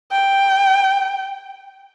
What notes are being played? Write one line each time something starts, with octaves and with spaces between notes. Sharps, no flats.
G5